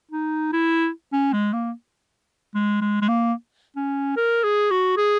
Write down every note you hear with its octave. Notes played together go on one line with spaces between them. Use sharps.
D#4
E4
C#4
G#3
A#3
G#3
G#3
G#3
A#3
C#4
A#4
G#4
F#4
G#4